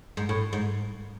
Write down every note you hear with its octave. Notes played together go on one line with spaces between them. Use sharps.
G#2
A2
G#2